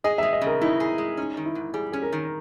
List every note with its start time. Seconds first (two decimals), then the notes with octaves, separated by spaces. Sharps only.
0.04 G#4 D#5
0.18 E5
0.23 G#3
0.33 D#5
0.41 C#3
0.47 A#4
0.61 D#4 E4
0.80 G#4
0.98 G#3
1.17 C#4 D#4
1.37 D#3
1.45 E4
1.55 G#2
1.74 G3 G#4
1.92 C#4 G#4
2.02 A#4
2.12 D#3